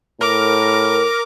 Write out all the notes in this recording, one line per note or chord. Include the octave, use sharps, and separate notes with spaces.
A2 A#4 D6